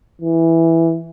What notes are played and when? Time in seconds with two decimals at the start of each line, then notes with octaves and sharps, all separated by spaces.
0.21 E3